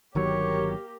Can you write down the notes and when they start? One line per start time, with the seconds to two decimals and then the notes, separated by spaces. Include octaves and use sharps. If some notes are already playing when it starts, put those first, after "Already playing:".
0.15 G1 D#3 F#3 A#3 G4 A#4 C#5